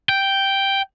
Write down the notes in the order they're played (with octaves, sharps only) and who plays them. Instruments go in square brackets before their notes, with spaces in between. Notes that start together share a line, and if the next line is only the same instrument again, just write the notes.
[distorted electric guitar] G5